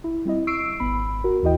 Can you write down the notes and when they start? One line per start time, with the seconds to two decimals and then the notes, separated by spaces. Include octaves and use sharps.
0.04 E4
0.25 G3 C4 E4 D#5
0.47 C#6 E6 C7 D7
0.80 G#1 B3 B5
1.24 F#4 A#4
1.43 D#2 E3 E4 F#4 D#5 G5